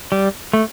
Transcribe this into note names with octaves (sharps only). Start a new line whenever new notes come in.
G3
A3